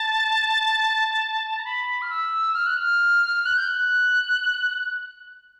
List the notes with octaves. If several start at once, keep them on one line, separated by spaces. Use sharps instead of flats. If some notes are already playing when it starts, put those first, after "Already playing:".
Already playing: A5
A#5
B5
F6
E6
F6
F#6
F6
F#6
G6
F#6